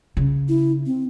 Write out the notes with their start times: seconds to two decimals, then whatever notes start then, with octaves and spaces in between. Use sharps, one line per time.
0.17 C#3
0.49 E4
0.86 C4